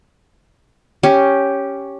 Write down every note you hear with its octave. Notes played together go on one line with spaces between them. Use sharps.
C#4 G4